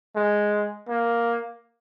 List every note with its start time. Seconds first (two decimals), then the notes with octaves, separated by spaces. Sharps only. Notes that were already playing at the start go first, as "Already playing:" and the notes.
0.16 G#3
0.88 A#3